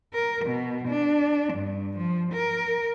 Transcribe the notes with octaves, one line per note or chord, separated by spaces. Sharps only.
A#4
B2
D4
G2
F3
A#4